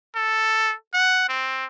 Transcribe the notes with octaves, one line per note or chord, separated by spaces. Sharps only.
A4
F#5
C4